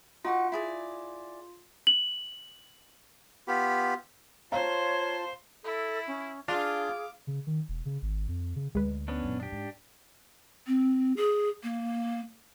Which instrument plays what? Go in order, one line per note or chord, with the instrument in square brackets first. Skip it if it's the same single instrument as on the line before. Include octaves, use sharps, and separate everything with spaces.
[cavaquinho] D#4 F#4 F#5 [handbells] F4
[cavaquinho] E4 G#4 D5
[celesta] F#7
[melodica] B3 F4 G4 B5
[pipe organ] F4 A5 C6 [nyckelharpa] C5 [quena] C#5 [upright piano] F5 A#5
[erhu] E4 [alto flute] A4
[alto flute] C#4
[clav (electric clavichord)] D4 [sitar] F4 [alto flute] G#4 [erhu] D6
[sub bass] C#3
D#3
E1
C#3
G#1
F2
C#3
[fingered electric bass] D2 [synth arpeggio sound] G#3 B4
[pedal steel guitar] B3 C#4 D4
[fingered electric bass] F#2 A#2
[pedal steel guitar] D4 G4
[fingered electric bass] G#2
[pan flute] C4
G#4
A#3